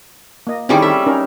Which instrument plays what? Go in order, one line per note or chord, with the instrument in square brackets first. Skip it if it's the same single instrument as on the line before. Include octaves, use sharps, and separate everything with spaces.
[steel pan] A#3 D#5
[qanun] D#3 G3 C#4 [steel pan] C4 E4 G#4
[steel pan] A4 [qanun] E5
[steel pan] C#4 D#4 A#4